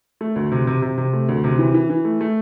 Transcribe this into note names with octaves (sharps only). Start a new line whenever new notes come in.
A3
D2
C3
C3
C3
C3
A3
D2
C3
E3
E3
E3
A3
A3